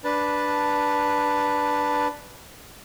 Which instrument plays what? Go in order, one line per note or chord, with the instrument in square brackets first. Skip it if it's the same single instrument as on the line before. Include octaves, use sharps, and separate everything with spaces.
[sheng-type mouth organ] D4 B4 A5